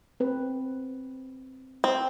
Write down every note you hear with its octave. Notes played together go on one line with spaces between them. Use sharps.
C4 B4
C4